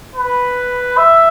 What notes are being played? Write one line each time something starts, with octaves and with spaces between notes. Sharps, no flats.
B4
E5